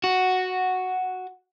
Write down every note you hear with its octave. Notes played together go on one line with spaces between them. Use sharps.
F#4